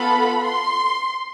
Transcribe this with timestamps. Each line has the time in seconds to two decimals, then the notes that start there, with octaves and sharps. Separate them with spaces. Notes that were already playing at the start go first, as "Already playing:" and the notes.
Already playing: B3 F4 A4 B5
0.45 C6